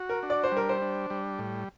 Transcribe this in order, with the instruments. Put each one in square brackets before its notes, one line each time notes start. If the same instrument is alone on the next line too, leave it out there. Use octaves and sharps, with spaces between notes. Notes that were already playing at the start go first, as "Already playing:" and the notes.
Already playing: [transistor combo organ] F#4
[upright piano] A#4
[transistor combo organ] D4
[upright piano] D5
C5
[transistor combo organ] G3 [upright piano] A#4
[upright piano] C5
[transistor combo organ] D4
G3
A2